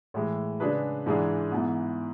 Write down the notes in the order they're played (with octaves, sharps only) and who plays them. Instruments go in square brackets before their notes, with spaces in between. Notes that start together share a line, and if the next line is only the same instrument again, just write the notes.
[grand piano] A2 E3 G#3
C#3 G#3 D4 G#4 B4
G#2 E3 G#3 D4 G#4
G#2 E3 B3